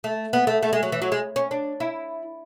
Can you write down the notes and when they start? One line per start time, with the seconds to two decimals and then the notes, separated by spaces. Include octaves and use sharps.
0.04 A3
0.33 B3
0.47 A3
0.63 A3
0.73 G#3
0.83 F#3
0.92 E3
1.02 F#3
1.12 G#3
1.36 C#4
1.51 D4
1.80 E4